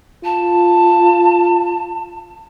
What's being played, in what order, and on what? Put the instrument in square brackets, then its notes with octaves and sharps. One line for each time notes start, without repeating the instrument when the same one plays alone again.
[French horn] F4 [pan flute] A5